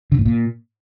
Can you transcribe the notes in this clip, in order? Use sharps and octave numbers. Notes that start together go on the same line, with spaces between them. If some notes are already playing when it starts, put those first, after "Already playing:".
D3
A2
A#2